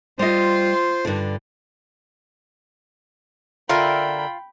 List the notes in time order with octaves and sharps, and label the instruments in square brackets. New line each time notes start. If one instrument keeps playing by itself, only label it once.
[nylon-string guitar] G3 D#5 [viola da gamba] F4 [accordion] C5
[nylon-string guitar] G2 D3
[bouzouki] D3 A#4 E5 [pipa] F4 [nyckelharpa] G5 B5